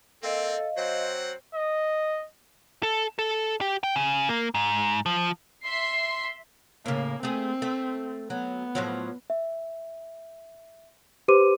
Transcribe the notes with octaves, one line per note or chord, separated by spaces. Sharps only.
A#3 C4 A4 D#5 F5
F#3 C4 C5 F#5
D#5
A4
A4
G4
G5
C#3
A#3
G#2
F3
E5 C6 C7
A2 C#3 A#3
A3 C4 G#4
A3
F#3 B3
A2 F3 F#3
E5
G4 B4 C5 C6 D6 D#7